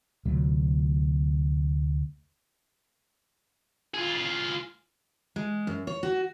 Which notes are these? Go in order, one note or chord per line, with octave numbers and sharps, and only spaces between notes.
D2 C3 F#3 A3
F4 G#4
G#3
F#2
C#5
F#4